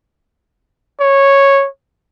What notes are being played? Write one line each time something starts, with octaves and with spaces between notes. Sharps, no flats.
C#5